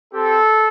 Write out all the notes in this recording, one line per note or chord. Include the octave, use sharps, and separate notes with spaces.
C4 G4 A4